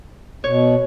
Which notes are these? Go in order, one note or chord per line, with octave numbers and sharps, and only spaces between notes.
B2 C#5